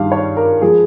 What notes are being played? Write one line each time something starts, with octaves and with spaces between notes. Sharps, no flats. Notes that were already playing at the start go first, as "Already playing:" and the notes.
Already playing: G2 D#3 G3 F5
C#5
A#4
F3 G#3 G#4